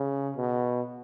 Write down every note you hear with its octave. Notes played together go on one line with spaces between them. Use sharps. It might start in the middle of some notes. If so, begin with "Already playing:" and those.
Already playing: C#3
B2